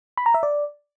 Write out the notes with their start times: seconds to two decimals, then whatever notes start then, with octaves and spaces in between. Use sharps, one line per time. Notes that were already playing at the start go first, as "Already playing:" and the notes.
0.17 B5
0.26 A#5
0.34 E5
0.43 D5